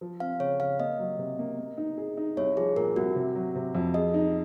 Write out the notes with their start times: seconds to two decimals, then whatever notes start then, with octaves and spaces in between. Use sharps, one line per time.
0.01 F3
0.20 C4 F5
0.40 C#3 C#5
0.60 C#3 F5
0.80 A#3 D#5
0.99 F#3
1.19 C3
1.39 A#3
1.58 A#3
1.78 D#4
1.98 G#4
2.17 D#4
2.37 C2 C#5
2.57 F3 G#4
2.76 A#2 A#4
2.96 C2 F#4
3.16 C3
3.35 F#3
3.56 C3
3.75 F2
3.94 G#4 D#5
4.14 D#4